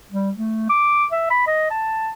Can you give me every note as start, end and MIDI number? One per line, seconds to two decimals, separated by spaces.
0.11 0.31 55
0.37 0.66 57
0.69 1.05 86
1.12 1.25 76
1.30 1.46 83
1.47 1.68 75
1.70 2.10 81